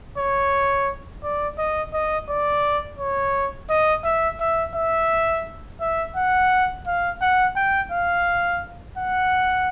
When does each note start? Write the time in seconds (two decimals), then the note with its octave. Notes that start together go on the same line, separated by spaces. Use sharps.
0.18 C#5
1.23 D5
1.58 D#5
1.94 D#5
2.29 D5
2.99 C#5
3.70 D#5
4.04 E5
4.40 E5
4.75 E5
5.81 E5
6.16 F#5
6.86 F5
7.22 F#5
7.56 G5
7.92 F5
8.98 F#5